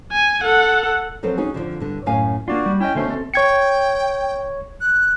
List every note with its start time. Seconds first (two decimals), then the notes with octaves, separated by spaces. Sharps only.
0.12 G#5
0.43 A4 F#5
1.23 F3 F#3 C4 A4 B4
1.37 C#4 D#4 F#4 G#4
1.54 F2 A#2 D3 F3
1.80 G2 D3
2.06 F#2 A2 C#4 F5 G#5
2.48 A#3 D4 F4 F#4 D5
2.66 G3
2.80 C#4 E4 D#5 G5
2.95 B2 D3 A3 A#3 C#4 C5
3.09 C4 A4
3.34 C#5 G5 G#6 C#7
4.81 F#6